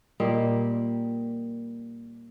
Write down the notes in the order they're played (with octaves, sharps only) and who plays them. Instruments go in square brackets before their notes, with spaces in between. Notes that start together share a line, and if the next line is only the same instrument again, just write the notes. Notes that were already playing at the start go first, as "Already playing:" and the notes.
[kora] A#2 G3 A#3 D#5